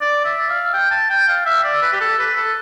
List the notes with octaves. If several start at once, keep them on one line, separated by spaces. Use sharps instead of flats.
D5
E5
F5
G5
A5
G5
F5
E5
D5
B4
G4
A4
B4
A4